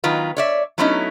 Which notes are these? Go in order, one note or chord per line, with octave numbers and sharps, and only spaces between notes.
D#3 F#3 B3 F4 B4
C#5 D5 E5
F#3 A3 B3 C#4 D#4 E4